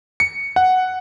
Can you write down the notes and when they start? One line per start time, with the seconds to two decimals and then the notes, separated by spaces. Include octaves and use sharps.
0.20 C#7
0.56 F#5